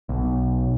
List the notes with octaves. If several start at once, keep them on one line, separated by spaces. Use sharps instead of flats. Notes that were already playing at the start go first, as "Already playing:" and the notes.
B1